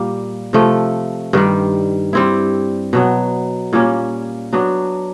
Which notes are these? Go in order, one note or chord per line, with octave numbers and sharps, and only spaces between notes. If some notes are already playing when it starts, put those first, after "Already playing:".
Already playing: A#2 G3 A#3
C3 F3 A3
G2 D#3 G3
G3 C4 E4
B2 F#3 B3
A#2 G3 A#3 C#4
F#3 B3 D4 F#4